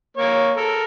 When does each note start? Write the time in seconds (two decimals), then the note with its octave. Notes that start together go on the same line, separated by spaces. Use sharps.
0.17 A#3 C#5
0.57 A4 A#4